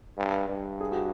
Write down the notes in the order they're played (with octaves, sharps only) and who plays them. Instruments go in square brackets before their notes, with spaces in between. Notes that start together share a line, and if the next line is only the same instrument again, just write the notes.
[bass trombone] G2
G2
[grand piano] G#4
F#4
G4